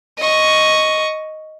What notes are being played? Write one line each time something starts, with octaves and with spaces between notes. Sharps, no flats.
D#5 C#6